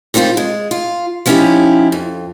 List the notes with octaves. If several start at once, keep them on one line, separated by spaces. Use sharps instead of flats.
D#3 G3 C4 E4 F4
G#3
F4
F3 B3 C#4 D#4 E4 G4
F2